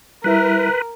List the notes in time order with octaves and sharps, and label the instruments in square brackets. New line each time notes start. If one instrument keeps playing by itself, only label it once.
[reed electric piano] G3 E4 E5 [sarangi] A#4 [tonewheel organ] B4